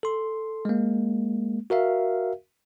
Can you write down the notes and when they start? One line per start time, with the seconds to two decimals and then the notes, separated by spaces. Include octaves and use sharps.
0.03 A4 C6
0.65 G#3 A#3
1.70 F#4 A#4 E5 F5